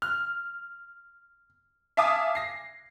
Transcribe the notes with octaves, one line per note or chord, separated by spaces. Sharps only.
F6
E5 F5 G#5 A5 D6 D#6
A#6 C7